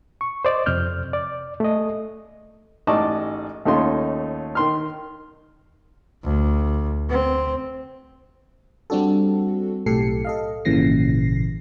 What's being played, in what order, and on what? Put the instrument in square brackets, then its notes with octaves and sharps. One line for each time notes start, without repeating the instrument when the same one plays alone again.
[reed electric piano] C#6
C5 D5 D#5
F2 C3 F6 G6
D5
A3 D#5
[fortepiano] A1 G#2 D5 D#5 A5 C#6
D#2 A3 C#4 D#4 F4 C6
D#3 C6 F6
[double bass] D2
C4
[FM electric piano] G3 C4 D4 F#4 A4
B1 A2 G4 A4 C7 C#7
A4 D#5 F5
G#1 A#2 C#3 E3 A#6 C7